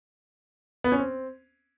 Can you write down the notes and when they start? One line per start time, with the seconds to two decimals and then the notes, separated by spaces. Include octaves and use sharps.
0.84 B3
0.92 C#4
0.99 C4